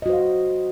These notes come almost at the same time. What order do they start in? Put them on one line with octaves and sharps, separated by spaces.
D#5 F#4 C5 F5